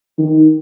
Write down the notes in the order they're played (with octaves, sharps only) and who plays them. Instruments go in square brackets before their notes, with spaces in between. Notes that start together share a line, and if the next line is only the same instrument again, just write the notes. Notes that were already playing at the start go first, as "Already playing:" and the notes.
[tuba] D#3